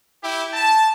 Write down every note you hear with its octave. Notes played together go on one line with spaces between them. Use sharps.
E4 G4
A5